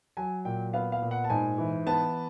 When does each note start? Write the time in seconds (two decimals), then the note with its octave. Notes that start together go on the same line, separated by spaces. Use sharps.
0.17 F#3 G#5
0.45 A#2 G5
0.73 B3 F5
0.92 F5
1.02 A#2
1.11 F#5
1.24 A5
1.30 G#2 G#5
1.58 E3
1.86 B3 A5